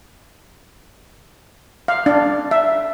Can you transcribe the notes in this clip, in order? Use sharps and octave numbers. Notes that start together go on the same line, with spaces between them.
F5
D4
E5